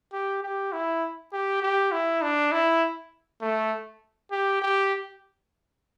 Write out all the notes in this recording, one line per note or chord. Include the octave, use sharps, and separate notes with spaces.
G4
G4
E4
G4
G4
E4
D4
E4
A3
G4
G4